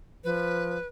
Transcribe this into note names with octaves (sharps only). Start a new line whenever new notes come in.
F3 B4